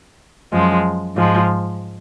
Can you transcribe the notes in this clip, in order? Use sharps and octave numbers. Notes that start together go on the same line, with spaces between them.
F#2 F3 G#3
G#2 F3 G#3